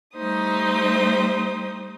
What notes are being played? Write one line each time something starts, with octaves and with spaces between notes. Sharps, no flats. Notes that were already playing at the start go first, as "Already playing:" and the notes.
G3 A3 D#4 C5 D#6